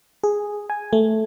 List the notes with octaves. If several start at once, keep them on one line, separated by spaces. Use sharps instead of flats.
G#4
G#5
A3